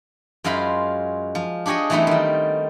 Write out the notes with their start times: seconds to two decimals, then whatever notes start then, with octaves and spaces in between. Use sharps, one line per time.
0.44 F#2 G#3 F4 C5 B5
1.35 F3
1.66 D4 G4 G#4 C#5 D#5
1.90 E3 F#3 A3 B3 C4 D#4
2.07 D#3 G3